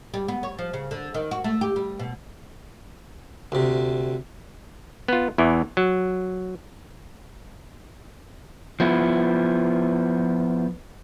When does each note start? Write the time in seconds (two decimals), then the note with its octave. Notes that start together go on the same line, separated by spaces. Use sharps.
0.14 G3
0.28 B3
0.43 C#5
0.59 F3
0.73 C#3
0.91 D3
1.14 D#3
1.31 F#4
1.44 A3
1.61 G4
1.76 G3
1.99 B2
3.52 D2 C3
5.08 B3 F4
5.38 E2 E3
5.77 F#3
8.80 F3 B3 E4